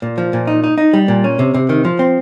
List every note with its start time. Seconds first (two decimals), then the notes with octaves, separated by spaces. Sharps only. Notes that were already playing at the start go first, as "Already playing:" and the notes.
0.02 A#2
0.18 F3
0.33 A#2
0.47 D#4
0.64 D#4
0.78 D#4
0.94 G3
1.08 A#2
1.24 C#4
1.39 C3
1.54 C3
1.69 D#3
1.85 F3
1.99 C4